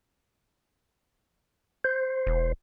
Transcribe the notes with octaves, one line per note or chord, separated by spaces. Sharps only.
C5
E1